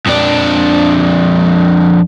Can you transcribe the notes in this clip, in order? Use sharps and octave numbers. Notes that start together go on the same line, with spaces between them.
F2 D4